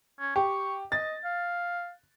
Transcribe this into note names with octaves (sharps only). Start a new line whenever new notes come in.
C#4
G4 C#6
D#5 A6
F5